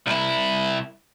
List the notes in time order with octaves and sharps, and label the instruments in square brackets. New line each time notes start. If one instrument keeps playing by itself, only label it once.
[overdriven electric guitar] C2 E4